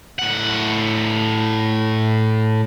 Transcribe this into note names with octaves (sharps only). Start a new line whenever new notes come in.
A2 F#5